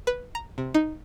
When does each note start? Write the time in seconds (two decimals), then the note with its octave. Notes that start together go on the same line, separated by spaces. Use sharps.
0.07 B4
0.35 A#5
0.58 C3
0.74 D#4